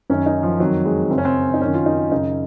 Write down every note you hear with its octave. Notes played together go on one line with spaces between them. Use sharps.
F#2 D#3 C#4
D#4
F3
F2 D#3 F#3
G#3
F#2 C#3 C4
C#4
C4
D#4
F#2 D#3 C#4
F4
D#4
F#2 C#3 D#4